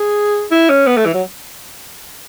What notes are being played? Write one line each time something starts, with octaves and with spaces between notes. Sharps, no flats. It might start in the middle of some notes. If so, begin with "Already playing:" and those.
Already playing: G#4
E4
C#4
B3
A3
E3
F#3